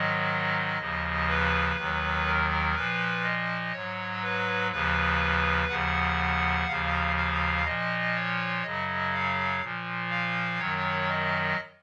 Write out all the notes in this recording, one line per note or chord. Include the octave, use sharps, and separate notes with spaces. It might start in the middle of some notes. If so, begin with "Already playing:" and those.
Already playing: G#2 D#3 F#3 D#5
D#2 C#3 F3
B4
D#2 D#3 F#3
A#4
A#2 F3 B4
D#5
G#2 F#3 C#5
B4
D#2 C#3 F3 B4
D#2 C#3 F3 F#5
D#2 C#3 F3 F5
F5
A#2 F3 D#5
C#5
F#2 C#3 F#3 D#5
F5
A#2 F3
F5
F#2 D#3 F#3 C#5
D#5